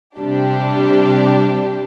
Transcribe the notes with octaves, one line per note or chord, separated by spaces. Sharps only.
C3 G3 D4 G4